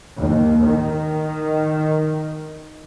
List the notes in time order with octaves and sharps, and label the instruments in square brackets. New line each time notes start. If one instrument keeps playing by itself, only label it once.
[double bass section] D#2
D#3